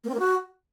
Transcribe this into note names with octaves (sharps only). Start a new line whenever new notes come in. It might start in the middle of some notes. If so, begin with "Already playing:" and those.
A#3
C4
A#3
F#4